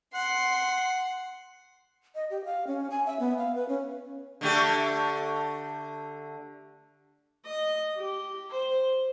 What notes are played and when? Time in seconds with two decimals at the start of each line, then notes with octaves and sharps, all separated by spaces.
0.15 F#5 C6
2.15 D#5
2.30 G4
2.45 F5
2.67 C#4
2.90 G#5
3.06 E5
3.20 B3
3.38 F5
3.55 B4
3.69 C#4
4.41 D3 A3 G4
7.45 D#5
7.97 G4
8.51 C5